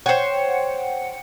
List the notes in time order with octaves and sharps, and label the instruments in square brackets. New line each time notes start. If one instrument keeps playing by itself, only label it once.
[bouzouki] C5 C#5 [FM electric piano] F#5 G5 C#7